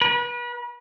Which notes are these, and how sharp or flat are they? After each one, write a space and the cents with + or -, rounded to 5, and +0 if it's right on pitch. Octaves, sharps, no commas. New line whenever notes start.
B4 -35